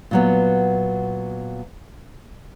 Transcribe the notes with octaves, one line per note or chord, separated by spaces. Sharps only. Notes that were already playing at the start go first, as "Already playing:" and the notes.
A#2 F#3 B3